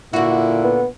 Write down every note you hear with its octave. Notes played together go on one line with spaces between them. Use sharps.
A#2 D3 E4 F#4
B3